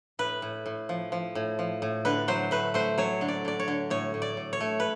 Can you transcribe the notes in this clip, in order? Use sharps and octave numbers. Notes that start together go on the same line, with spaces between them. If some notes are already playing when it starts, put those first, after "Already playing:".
A2 B4
A2
A2
F3
F3
A2
F3
A2
D3 B4
F#3 C5
A3 B4
A3 C5
F#3 C#5
D3
D5
D3 D5
C#5
D3
A2 C#5
A2
D5
A2
C#5
A3
B4